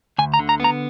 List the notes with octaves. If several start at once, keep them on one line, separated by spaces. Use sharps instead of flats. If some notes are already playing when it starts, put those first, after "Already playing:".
D2 G#5
A#5
D3
A#5
B3 A#5